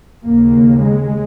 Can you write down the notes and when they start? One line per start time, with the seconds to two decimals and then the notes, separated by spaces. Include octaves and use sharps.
0.25 D#2 C#3 A#3
0.80 G#3